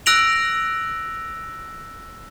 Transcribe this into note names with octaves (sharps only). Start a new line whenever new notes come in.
E6 F#6 A#6 D7 F7 F#7